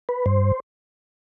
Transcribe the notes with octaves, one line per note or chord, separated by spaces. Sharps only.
B4
G2 C5